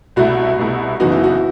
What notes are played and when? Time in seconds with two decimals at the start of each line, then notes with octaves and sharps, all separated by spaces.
0.16 C2 B2 A3 E4 F#4
0.58 C2 B2 A3 E4
1.00 F#1 F#2 E3 B3 D#4 F#4
1.12 E4
1.24 F#4